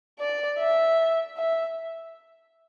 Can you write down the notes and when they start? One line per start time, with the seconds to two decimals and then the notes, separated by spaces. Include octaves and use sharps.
0.20 D5
0.59 E5
1.37 E5